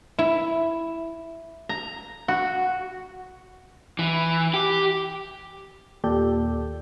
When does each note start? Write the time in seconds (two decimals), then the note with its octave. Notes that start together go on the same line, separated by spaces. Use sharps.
0.19 E4
1.69 A#5
2.28 F#4
3.99 E3
4.54 G4
6.04 D#2 A#2 G4 A4 D5 G6